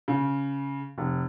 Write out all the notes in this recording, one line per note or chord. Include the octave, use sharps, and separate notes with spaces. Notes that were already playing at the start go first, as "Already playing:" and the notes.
C#3
F1